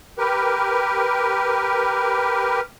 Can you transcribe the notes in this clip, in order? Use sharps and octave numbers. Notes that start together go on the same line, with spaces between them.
G4 A#4 B4